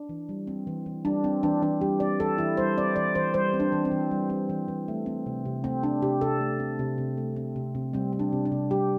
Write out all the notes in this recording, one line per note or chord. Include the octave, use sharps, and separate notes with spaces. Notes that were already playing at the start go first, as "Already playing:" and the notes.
Already playing: D4
E3
G3
C4
E3
E3
G3 D4
C4
E3 D4
E3 D4
G3 G4
C4 D5
E3 A4
E3 E4
G3 C5
C4 D5
E3 D5
E3 C5
G3 C5
C4
D4
E3
C4
E3
G3
C4
E3
E3
A3
C4
C3
C3
A3 C4
C4 D4
C3 G4
C3 A4
A3
C4
C3
C3
A3
C4
C3
C3
G3 C4
C4
D4
C3
D4
C3
G3 G4